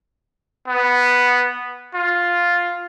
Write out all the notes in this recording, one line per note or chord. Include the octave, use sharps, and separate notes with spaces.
B3
F4